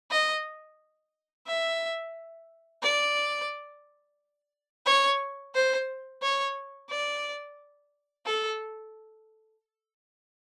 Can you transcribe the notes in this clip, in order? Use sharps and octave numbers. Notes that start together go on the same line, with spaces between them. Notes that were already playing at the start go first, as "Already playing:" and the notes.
D#5
E5
D5
C#5
C5
C#5
D5
A4